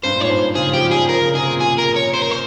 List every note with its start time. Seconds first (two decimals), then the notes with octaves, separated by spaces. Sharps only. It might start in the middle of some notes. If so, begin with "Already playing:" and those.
0.03 G2 C5
0.12 A#2
0.17 G#2
0.21 C#5
0.29 G2 C5
0.56 C#3 G#4
0.69 F3
0.73 G4
0.83 G3
0.91 F3 G#4
1.09 F3 A#4
1.21 C#3
1.35 C3 G#4
1.48 A#2
1.61 G#4
1.79 A#4
1.96 C#5
2.14 C5
2.22 A#4
2.31 C5